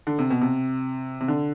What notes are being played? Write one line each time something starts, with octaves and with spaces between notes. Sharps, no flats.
D3
C3
B2
C3
C3
D3